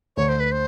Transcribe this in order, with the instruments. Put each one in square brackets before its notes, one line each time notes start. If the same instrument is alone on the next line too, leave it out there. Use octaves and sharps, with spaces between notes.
[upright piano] D2 [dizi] C#5
[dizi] C5
B4
C5